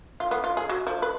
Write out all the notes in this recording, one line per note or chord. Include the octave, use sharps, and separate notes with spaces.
F4
B3
F4
G#4
F#3
F3
B4